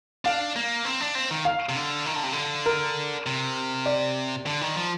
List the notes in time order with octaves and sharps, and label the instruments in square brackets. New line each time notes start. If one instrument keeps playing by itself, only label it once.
[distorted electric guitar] D4 [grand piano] F5
[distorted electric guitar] A#3
C4
D4
C4
D#3
[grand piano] F5
[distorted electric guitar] C3
D3
D#3
D3
C3
D3
[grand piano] A#4
[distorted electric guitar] C3
[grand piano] D5
[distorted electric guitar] D3
D#3
F3